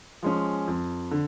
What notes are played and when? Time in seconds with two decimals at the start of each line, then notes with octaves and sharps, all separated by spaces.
0.23 F3 G#3 C#4
0.68 F2
1.11 D3